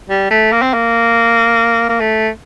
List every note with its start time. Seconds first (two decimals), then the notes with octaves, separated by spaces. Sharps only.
0.10 G3
0.31 A3
0.52 A#3
0.62 C4
0.74 A#3
1.89 A#3
2.00 A3